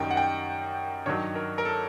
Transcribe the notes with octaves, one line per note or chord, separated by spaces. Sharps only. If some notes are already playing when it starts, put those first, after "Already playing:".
Already playing: F#2 D#3 G3 G5
F#5
G5
G2 D#3 F#3 C#5
A#4
A#4
A4